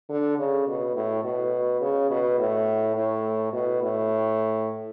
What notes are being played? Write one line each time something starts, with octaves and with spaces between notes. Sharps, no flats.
D3
C#3
B2
A2
B2
C#3
B2
A2
A2
B2
A2